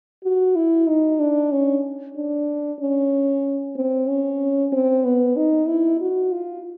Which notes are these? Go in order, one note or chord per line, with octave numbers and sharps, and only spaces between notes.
F#4
E4
D#4
D4
C#4
D4
C#4
C4
C#4
C4
B3
D#4
E4
F#4
F4